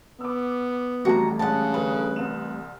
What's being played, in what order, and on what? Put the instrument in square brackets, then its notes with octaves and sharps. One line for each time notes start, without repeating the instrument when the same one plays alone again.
[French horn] B3 [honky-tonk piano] D6 E6
[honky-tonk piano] F2 [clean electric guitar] E3 G3 A3 [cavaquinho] F#4 A#5
[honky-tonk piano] A#1 G#3 [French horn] C#3 [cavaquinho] F#5 A5
[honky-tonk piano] G1 D#6 [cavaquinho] B4
[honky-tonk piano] C2 C4 E7